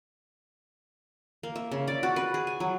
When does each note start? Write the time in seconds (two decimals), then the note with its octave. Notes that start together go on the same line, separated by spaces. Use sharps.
1.43 A#3
1.56 E5
1.72 C#3
1.88 D5
2.03 F#4
2.16 B4
2.34 G#4
2.47 G#5
2.60 F#3